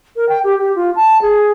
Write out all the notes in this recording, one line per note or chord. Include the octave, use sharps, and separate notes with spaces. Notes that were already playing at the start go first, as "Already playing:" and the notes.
A#4
G5
G4
G4
F4
A5
G#4